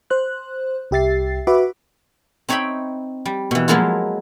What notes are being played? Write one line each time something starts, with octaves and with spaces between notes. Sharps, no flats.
C5 F#6
C2 G4 E5 A6 C7
F#4 B4 E5 F#5 B5 D6
C4 D#4 C#5 E5 G5 B5
G3
B2 E3
F3 F#3 G#3 A#3 E4 F4